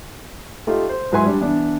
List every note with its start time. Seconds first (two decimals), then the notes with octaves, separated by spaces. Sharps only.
0.67 A3 D#4 F4 G4
0.89 C5
1.12 G#2 F#3 E4 B4 G#5 C6
1.26 G3 D4
1.41 E3 B3 D4